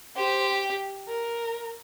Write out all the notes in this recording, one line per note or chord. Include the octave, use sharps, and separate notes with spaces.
G4 C5
A#4